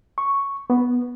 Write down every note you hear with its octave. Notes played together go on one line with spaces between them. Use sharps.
C#6
B3